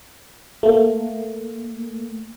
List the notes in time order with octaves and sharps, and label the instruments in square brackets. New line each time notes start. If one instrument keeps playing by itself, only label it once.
[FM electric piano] A3 A#3